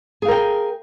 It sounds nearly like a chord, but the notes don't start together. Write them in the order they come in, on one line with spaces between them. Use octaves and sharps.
G#4 F5 A#4 G5